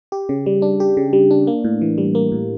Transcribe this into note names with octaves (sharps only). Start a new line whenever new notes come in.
G4
C#3
G3
D4
G4
C#3
G3
D4
A#3
A2
E3
G3
A#3
A2